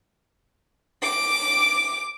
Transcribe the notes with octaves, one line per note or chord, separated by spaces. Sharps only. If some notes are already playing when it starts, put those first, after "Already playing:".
D6